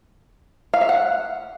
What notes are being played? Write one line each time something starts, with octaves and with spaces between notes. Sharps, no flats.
F5
E5
F#5